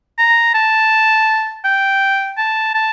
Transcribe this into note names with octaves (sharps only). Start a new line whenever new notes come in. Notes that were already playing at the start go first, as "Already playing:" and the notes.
A#5
A5
G5
A5
A5